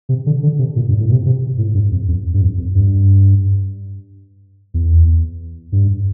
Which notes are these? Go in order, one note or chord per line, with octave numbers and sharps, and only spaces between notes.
C3
D3
D3
C3
A#2
G2
A2
A#2
C3
C3
A2
G2
F2
F2
G2
F2
F2
G2
E2
G2